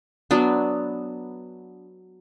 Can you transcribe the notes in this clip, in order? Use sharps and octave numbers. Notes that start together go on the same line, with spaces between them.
F#3 B3 D4